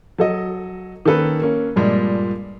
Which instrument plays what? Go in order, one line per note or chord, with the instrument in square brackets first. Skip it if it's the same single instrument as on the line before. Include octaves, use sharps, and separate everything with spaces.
[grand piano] F#3 A4 D#5
D#3 A#3 C#4 A4 B4
A#3 C#4
G2 A#2 F3 G3 G#3 D4